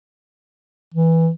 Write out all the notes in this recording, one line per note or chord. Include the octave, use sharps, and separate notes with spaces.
E3